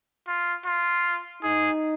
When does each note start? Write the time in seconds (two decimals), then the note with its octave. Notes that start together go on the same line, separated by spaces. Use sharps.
0.28 F4
0.66 F4
1.43 D#4 G#4